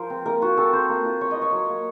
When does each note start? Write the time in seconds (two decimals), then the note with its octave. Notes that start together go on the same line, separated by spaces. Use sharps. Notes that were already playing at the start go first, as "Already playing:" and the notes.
Already playing: F3 F4 A#4 C5
0.10 C4
0.26 A#3 A#4
0.42 F4 F#4
0.57 C4 A4
0.73 C4 C5
0.89 A#3
1.05 F4
1.21 F4 C#5
1.31 D#5
1.36 F4
1.42 C#5
1.52 F#3
1.69 A#3